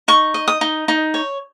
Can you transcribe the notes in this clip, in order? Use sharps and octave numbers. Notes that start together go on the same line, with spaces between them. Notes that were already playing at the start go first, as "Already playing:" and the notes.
D#4 C#6
D#5
D#6
D#4
D#4
C#5